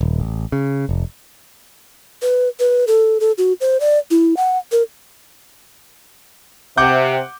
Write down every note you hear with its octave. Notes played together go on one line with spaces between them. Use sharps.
D#1
A1
C#3
F1
B4
B4
A4
A4
F#4
C5
D5
E4
F#5
A#4
C3 F#5 D6 G6